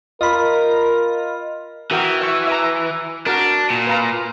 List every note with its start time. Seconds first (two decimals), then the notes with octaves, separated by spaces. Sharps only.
0.21 F4 A#4 D#5 B5
1.91 E3 F#4 A#4 G5
2.21 E5 C#6
2.48 E5 A#5
3.26 D4 F#4 A#4
3.70 A#2
3.87 B4 F5 A#5